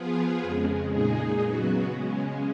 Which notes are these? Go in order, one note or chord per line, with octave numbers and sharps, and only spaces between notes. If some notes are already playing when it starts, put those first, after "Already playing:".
Already playing: F3 B3 F4 G#4
F2 C#3 G#3
A#2 G#3 D#4 G#4
C#3 F#3 B3 F#4
C#3 G#3 C#4